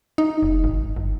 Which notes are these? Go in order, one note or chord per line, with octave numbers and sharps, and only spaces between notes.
D#4
F1
G#1
G1